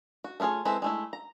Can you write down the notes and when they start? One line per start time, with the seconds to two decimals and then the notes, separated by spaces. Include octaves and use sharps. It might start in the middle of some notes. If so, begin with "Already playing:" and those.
0.24 F#4
0.40 A3 B3 F4 G#4 C#5
0.65 G#3 C4 E4 A4 B4
0.82 G#3 A3 E4
1.13 A#5